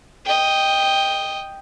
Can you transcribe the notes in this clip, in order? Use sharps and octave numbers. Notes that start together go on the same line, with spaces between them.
D#5 G5